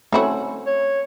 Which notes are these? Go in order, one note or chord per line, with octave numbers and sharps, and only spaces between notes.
A3 C4 C#4 D#4 E4 F#4
C#5